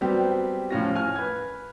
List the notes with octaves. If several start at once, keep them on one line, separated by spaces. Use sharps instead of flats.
F#3 G3 B3 C4 G4
A2 F3 C#4 F4 A#6
G#5 F6
B4 G#6